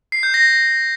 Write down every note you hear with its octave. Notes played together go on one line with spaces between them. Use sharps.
C7
G6
A#6